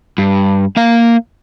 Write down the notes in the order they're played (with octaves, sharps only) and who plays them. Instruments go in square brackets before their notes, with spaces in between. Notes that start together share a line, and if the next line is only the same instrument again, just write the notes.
[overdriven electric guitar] G2
A#3 F5